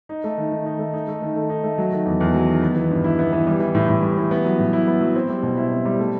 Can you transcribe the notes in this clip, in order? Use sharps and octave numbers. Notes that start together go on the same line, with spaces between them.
D#4
A3
D#3
D#3
D#4
A3
D#4
A3
D#3
A4
D#4
A3
F#3
D#3
E2
E2
F#3
D#3
B3
E3
G2
E4
B3
E3
G3
E3
A2
A2
G3
E3
B3
F#3
A2
E4
B3
F#3
C4
G3
B2
E4
C4
G3
A3